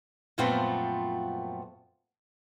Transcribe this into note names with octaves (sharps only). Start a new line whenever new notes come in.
F#2 A#2 F3 A3 B3 C4